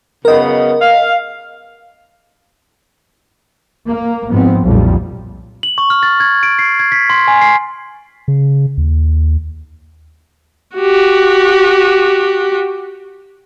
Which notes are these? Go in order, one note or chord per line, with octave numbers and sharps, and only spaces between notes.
F#2 C#3 B3 A#4 D#5
F5
A#3
G#2 F3 B3 C4
B1 F2 A#2 F3 G3
F#7
C#6
F6
A6
G#6
D7
C7
G#6
B6
C6
G#5
C7
C#3
D#2
F#4 G4